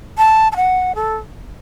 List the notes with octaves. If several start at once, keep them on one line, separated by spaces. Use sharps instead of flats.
A5
A5
F#5
A4